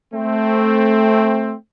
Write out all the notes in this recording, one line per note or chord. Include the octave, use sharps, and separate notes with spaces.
A3 C4